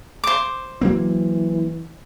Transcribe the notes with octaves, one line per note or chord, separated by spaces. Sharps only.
C5 D6
E3 F#3 A#3 C4